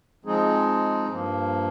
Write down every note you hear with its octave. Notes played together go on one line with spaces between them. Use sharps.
F3 G#3 C4 D#4 G#4
G2 F3 A#3